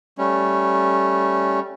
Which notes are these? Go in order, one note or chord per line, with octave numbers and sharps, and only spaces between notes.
G3 A3 C#4